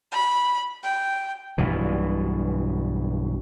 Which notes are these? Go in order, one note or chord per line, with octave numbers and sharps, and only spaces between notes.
B5
G5
B1 G2 B2 E3